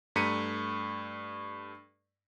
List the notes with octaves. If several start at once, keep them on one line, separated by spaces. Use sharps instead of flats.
G2 A3 A#5 B6 C#7 D#7